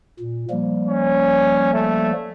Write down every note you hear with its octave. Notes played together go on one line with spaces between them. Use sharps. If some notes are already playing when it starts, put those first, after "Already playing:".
A#2
F3 G3 A#3
C#4
A3